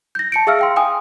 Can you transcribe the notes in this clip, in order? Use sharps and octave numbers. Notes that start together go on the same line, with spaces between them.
G6 A#6
A5 C#7 D7
G#4 E5 F5 E6 F6
F5 G5 C6
G5 G#5 D#6